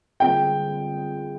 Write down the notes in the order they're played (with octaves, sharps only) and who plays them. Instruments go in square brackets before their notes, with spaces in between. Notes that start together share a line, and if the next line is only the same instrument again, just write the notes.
[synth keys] D3 G3 C4 F4 G#4 [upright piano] G5